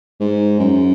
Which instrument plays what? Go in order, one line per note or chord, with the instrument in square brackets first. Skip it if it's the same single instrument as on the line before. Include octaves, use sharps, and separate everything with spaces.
[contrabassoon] G#2
F#2